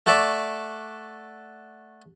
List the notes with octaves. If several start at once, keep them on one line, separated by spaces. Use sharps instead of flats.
A3 F#4 A4 D5 E5